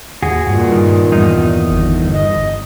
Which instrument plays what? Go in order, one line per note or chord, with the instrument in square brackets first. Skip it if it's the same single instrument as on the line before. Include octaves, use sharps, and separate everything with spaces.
[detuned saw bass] D#2 [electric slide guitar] F#4 G#4
[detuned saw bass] G2 [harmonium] A#2
[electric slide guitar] D#3
E2 D#3 D#4
[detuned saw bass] G1
[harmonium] D#5